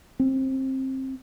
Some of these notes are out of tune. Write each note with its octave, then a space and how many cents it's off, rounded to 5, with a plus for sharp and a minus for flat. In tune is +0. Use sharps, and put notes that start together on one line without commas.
C4 +20